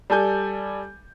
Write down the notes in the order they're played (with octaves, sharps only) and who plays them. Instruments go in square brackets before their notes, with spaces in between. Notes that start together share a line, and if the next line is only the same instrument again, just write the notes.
[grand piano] G3 A4 G#5 G6